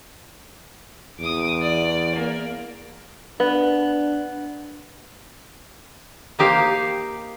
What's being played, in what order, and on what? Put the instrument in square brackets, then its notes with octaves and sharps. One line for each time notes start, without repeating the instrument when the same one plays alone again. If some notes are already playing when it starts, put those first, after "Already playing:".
[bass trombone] E2 [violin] D6 D#6
[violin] D5
A#3
[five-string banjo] B3 [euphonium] D4
[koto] A#3 D#4 G4 C5 F5